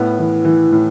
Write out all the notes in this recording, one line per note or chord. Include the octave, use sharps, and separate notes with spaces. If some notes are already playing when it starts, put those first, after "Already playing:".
Already playing: A2 B3
E3
E3
A2